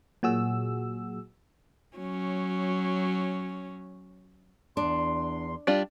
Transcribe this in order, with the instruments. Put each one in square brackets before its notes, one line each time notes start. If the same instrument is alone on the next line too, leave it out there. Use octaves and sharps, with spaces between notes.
[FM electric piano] A#2 F#3 F#4 G#4 E6
[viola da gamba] F#3 C#4
[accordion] E2 C6 [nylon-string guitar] D4
[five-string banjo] G3 D4 F4